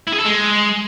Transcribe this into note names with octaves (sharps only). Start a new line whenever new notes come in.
E4
G#4
A4
G#3